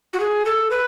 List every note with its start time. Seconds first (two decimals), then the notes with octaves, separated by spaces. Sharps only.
0.13 F#4
0.20 G#4
0.46 A4
0.71 B4